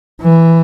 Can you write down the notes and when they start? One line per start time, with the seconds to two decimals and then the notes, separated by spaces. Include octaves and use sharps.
0.22 E3